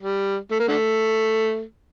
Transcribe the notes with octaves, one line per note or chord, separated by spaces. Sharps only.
G3
A3
A#3
D3 A3